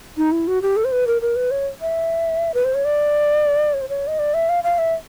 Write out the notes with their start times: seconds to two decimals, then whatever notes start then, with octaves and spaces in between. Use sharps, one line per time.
0.17 D#4
0.32 E4
0.47 F#4
0.62 G4
0.77 A4
0.85 C5
0.92 B4
1.07 A#4
1.22 A#4
1.36 B4
1.51 C#5
1.81 E5
2.54 B4
2.65 C5
2.74 C#5
2.85 D5
3.74 C#5
3.81 C5
3.89 C#5
4.07 D#5
4.19 D5
4.34 E5
4.49 F5
4.64 F5
4.78 E5